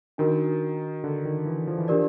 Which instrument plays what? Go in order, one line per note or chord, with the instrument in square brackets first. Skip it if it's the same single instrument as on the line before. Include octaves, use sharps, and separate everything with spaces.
[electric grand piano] D#3 [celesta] D4 F#4 A#4
[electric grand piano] D3
D#3
E3
F3
E3
[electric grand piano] F3 [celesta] D4 G4 A#4 D5